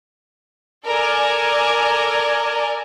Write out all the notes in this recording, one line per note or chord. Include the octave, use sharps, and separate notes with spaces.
A4 A#4 D5 G#5